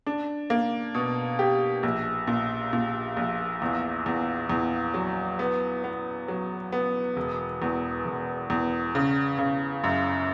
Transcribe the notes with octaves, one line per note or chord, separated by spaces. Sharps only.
D4
A#3
B2
G4
A#1
A#2
A#2
A#1
E2
E2
E2
F#3
B3
B3
F#3
B3
E1
E2
E1
E2
C#3
C#3
F#2